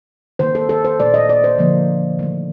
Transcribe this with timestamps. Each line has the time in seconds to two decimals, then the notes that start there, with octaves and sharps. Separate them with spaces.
0.39 D#3 A#3 C5
0.55 A4
0.69 A4
0.85 C5
1.00 A#2 A3 D5
1.14 D#5
1.29 D5
1.44 C5
1.58 D3 F3 A#3
2.19 D#3 A3